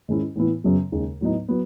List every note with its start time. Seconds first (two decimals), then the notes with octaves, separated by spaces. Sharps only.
0.08 G#2 D#3 G#3 C#4 E4
0.36 A2 E3 B3 E4
0.64 F#2 C#3 F#3 B3
0.92 D#2 C#3 G#3
1.21 A2 F#3 B3 D#4
1.48 F#3 B3